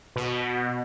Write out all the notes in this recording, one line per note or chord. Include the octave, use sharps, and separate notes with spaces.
B2